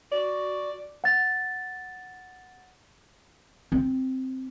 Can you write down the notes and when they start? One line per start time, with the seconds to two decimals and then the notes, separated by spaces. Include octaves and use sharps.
0.12 F#4 D5
1.04 F#5 A6
3.72 C4